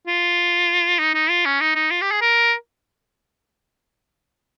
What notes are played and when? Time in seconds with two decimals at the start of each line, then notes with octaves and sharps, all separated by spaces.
0.07 F4
0.99 D#4
1.14 D#4
1.30 F4
1.45 C#4
1.60 D#4
1.75 D#4
1.91 F4
2.01 G4
2.11 G#4
2.21 A#4